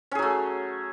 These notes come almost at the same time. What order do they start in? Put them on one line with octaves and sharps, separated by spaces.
C#4 G#4 F#3 A3